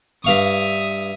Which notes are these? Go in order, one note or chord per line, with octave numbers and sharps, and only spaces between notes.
G2 E5 F5 C#6 D#6